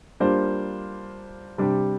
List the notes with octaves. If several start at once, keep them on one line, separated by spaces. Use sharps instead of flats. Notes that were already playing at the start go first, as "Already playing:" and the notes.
G3 A#3 D4 F4 C5
C3 G3 D4 G4